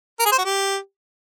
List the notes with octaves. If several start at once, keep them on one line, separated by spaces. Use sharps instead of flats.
A#4
G#4
C5
F#4
G4